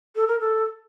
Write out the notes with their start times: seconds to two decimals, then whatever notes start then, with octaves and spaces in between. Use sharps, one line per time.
0.15 A4
0.27 A#4
0.40 A4